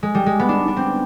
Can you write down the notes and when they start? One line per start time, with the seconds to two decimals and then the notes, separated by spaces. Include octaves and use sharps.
0.03 G#3
0.15 G3
0.26 G#3
0.39 B3
0.49 D4
0.68 D4
0.77 C4